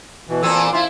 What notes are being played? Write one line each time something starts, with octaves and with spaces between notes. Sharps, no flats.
B2 E3
E2 A#2 C4 A4 G#5 E6
C4 E4 F4